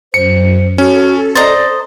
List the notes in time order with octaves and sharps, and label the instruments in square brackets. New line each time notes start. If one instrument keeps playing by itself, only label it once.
[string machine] F#2 [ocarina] C5 [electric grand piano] C#7
[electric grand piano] C#4 [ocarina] F#4 [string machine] A4
[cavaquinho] C5 D#5 A#5 [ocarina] D5 [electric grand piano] A6